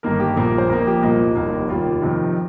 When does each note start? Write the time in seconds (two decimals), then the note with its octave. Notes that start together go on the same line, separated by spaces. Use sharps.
0.03 G1 G2 D#3 A#3 A#4
0.20 G4
0.37 A#1 A#2 A#3 A#4
0.58 C5
0.69 F2 F3 A#3 A#4
0.87 G4
1.03 C2 A#2 A#3 D#4
1.36 F1 D#2 D#3 A#3
1.69 D#2 D#3 G3 A#3 F4
2.02 F2 C3 D#3